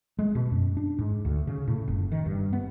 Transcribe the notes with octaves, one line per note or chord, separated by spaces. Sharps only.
G#3
B2
F#2
D4
G#2
D2
C#3
A2
F#1
D#3
G2
B3